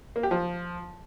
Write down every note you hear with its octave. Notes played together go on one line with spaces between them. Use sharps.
A#3
G4
F3